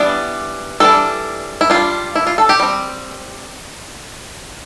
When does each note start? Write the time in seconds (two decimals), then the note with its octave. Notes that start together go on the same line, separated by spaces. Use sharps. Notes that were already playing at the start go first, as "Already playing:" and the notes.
Already playing: E3 G3 B3 D4 D5
0.80 E3 G3 D4 A4
1.61 E4
1.70 G3 D4 F4
2.16 E4
2.27 F4
2.38 A4
2.49 G4
2.60 G3 C4